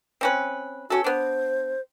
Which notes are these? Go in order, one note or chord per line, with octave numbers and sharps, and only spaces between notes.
C4 C#4 B4
C#4 F#4 A4
B3 D4 C5